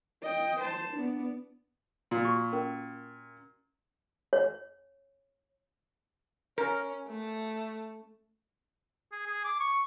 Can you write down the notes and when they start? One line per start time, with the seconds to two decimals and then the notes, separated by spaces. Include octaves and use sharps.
0.22 D#5 G5
0.60 C5 A5
0.93 B3 D4
2.11 A#2
2.25 F#4 C#6
2.53 C#4 A#4
4.33 C#5
6.58 C#4 A#4
7.08 A3
9.12 G#4
9.27 G#4
9.44 D6
9.60 C#6